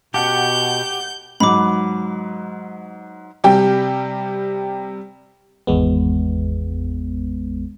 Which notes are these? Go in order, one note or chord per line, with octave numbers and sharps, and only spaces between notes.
B2 G4 F#5 A5 G6
G#2 F#3 B5 D6
C3 G3 G4 G5
G#1 E2 G#3 B3